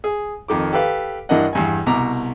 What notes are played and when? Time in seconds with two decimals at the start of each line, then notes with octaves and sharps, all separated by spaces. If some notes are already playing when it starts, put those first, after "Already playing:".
0.04 G#4
0.48 F2 D#3 D6
0.73 G4 A4 B4 F5
1.29 G2 E3 D4 A#4 D#5 F#5
1.53 E2 G2 G#5
1.86 C2 B2 A#5 D6